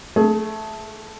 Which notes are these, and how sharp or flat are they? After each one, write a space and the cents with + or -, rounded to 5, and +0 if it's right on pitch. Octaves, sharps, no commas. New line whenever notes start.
A3 -5 G#4 +25